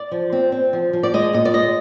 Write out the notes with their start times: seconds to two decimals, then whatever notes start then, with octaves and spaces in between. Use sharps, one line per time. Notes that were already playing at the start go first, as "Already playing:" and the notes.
Already playing: D5
0.11 F3
0.32 C4
0.52 C4
0.73 F3
0.93 F3
1.03 D5
1.14 G#3 D#5
1.33 A#2 D#5
1.45 D5
1.54 G#3 D#5